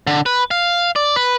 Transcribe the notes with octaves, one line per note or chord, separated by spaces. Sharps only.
D3
B4
F5
D5
B4